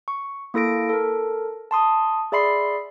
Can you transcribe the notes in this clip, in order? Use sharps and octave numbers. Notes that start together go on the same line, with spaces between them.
C#6
A#3 E4 A4 A#6 D7
A4 A#4
A5 C6 D#6
G#4 D5 E5 B5 C6 C7